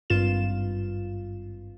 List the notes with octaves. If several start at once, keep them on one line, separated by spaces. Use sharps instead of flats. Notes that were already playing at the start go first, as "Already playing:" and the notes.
G#1 G2 F4 E7